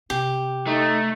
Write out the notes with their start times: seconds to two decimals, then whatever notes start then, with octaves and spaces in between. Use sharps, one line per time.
0.10 C3 G4
0.67 A3 D#4